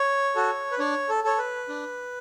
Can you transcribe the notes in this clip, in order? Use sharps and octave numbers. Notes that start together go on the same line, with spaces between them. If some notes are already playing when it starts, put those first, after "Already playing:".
Already playing: C#5
F#4 A4
B4
D4 C#5
A4
A4 C#5
B4
D4